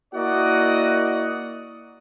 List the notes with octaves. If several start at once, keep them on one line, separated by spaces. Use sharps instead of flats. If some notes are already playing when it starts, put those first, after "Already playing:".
A#3 E4 F#4 D5 D#5 F#5